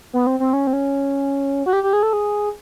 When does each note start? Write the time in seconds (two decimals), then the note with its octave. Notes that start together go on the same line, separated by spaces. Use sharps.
0.13 B3
0.27 C4
0.40 C4
0.53 C#4
0.67 C4
0.73 C#4
1.66 F#4
1.73 G4
1.83 G4
1.93 G#4
2.03 A4
2.13 G#4